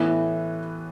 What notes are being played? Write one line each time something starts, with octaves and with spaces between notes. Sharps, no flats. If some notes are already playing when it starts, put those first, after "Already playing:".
Already playing: A2 E3 B3